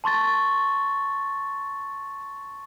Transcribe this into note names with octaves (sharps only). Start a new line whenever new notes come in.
A5 C6 C#6 A6